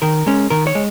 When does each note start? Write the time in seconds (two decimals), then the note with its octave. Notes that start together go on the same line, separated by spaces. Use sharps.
0.02 D#3 A#4
0.27 G#3 C#4
0.50 D#3 A#4
0.67 C#5
0.75 G#3